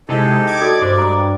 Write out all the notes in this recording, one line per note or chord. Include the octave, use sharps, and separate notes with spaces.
C3 G#3 D#4 E4 G4 A4
D6 G#6
F#4 A4 D5 D#5
G2 C5 C6 D6
A#5 D6